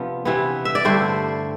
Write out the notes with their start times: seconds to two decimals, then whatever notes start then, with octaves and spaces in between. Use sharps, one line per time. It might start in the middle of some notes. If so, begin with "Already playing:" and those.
Already playing: C3 F3 B3 D4
0.25 C3 E3 B3
0.65 E5
0.75 D5
0.85 G2 D3 A3 C5